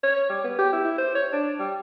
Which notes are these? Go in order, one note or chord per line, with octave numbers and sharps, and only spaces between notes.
C#5
G3
B3
G4
E4
E4
C5
C#5
D4
G3